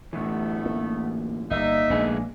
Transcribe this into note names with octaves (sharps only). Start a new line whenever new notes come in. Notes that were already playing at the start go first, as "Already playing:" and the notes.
A2 D3 E3 A3 B3
A#3
G1 G3 A#3 D#4 E5
A#1 G#3 A3 B3 D4 G#4